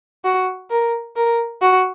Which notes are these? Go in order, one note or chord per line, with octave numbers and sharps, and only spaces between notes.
F#4
A#4
A#4
F#4